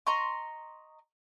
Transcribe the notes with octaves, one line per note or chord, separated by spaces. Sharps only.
D#5 A#5 C6 C#6